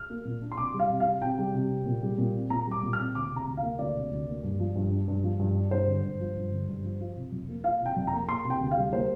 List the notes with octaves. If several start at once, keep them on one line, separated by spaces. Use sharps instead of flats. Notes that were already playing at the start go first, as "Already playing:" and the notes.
Already playing: F6
A#3
A#2
D4
C6
C3 D6
G3
F5
C3
F5
C4
C3 G5
G3
C3
C4
A#2
G3
A#2
C4
A#2 A#5
G3 D6
A#2
F6
C4
D2 D6
C3
A#5
D2
F5
A#3
D2 D5
C3
D2
A#3
G2
F3
G2
D4
G2
F3
G2
D4
G2 C5
D3
G2
F3
G2
D3
G2
F3
F4
C3
F2
A#3
F4 F5
C3 G5
F2
A#5
A#3
A#3 C6
C3
G5
D2
F5
G3
A#3 C5